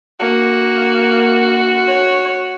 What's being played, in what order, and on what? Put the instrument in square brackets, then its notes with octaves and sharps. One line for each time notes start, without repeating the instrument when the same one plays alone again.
[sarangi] A#3 [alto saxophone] F#4
[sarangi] C#5